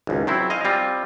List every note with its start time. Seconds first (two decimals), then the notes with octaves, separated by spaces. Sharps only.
0.07 G#1 C#2
0.27 F#3 C4 E4
0.50 D#5 F5 G#5
0.65 G3 C4 F4